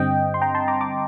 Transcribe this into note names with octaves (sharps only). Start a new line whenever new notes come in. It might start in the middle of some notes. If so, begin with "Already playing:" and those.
Already playing: G2 D3 G3 C4 D#5 G5
C6
G5 A#5
A5 C6
A#5 D6
A#5 D6